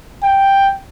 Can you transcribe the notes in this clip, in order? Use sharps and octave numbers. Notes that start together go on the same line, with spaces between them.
G5